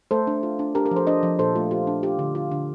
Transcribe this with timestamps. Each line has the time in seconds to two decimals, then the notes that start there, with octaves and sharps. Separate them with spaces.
0.11 A3 A4 C5
0.27 D4
0.43 F4
0.59 D4
0.75 D4 G4 A#4
0.85 G4 A#4
0.91 F3
0.96 A4 C5
1.07 D4 C5 D#5
1.23 F3
1.39 A#2 A4 C5
1.55 A3 F4
1.71 F4 G4
1.87 D4
2.03 F4 G4
2.19 D3
2.35 F4
2.51 D3